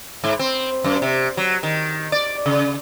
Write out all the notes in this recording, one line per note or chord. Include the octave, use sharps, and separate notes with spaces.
G#2
C4
F#2
C3
F#3
D#3
D5
C#3